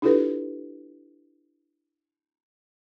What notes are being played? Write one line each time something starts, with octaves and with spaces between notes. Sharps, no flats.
D4 E4 F4 G4 A4 B4